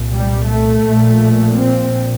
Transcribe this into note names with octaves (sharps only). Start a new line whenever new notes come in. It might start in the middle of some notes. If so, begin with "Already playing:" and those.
Already playing: C2 A#2
G3
A3
A#1 A#2
C4